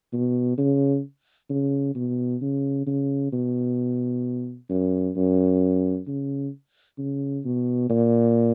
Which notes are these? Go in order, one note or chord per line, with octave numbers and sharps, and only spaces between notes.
B2
C#3
C#3
B2
C#3
C#3
B2
F#2
F#2
C#3
C#3
B2
A#2